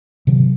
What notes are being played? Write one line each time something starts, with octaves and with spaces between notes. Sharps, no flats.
C3 D#3 F#3